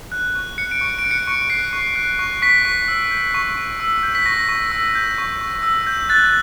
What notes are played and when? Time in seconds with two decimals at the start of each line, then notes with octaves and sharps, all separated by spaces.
0.12 F#6
0.35 C#6
0.58 F#6 C#7
0.71 D7
0.81 C#6 C#7
0.99 D7
1.04 F#6
1.11 C#7
1.27 C#6
1.50 F#6 C7
1.73 C#6
1.96 F#6
2.19 C#6
2.42 C#6 B6
2.65 C#6
2.88 E6
3.11 G6
3.34 C#6
3.57 C#6
3.80 E6
4.03 G6
4.15 B6
4.26 C#6 A#6
4.49 C#6
4.72 E6
4.95 G6
5.18 C#6
5.41 C#6
5.63 E6
5.87 G6
6.09 F#6 A6